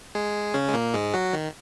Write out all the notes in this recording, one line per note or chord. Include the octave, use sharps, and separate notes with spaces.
G#3 G#4
C#3 C#4
G#3
A#2 A#3
G#2 G#3
F#3 F#4
D#3